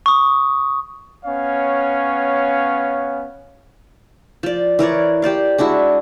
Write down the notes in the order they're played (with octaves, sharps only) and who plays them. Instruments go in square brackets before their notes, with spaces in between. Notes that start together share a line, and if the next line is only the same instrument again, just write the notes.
[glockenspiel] C#6 D#6
[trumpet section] B3 C#4 C#5 F5
[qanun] F3 D5
E3 A#4 C#5 D5
G4 C5 D5 F5
G#3 D4 E4 F#4